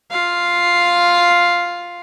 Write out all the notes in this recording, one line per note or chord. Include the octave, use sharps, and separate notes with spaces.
F4 F5